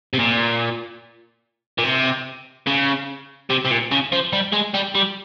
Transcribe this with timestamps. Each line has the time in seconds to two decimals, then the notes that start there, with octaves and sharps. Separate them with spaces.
0.13 C3
0.19 A#2
1.79 A#2
1.84 C3
2.67 C#3
3.50 C3
3.65 C3
3.70 A#2
3.91 C#3
4.12 F3
4.33 G3
4.53 G#3
4.74 G3
4.95 G3